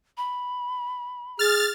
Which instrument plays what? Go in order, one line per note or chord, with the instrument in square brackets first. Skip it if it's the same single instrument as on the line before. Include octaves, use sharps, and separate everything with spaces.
[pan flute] B5
[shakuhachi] G#4 [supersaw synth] F6 A6